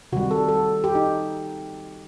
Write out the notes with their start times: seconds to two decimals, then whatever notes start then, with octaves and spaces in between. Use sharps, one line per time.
0.12 C3 D#3 G3 F#4
0.31 A4
0.49 A4
0.84 G4
0.95 D#4